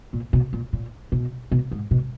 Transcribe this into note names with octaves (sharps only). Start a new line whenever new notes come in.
A#2
B2
A#2
A#2
B2
B2
G#2
B2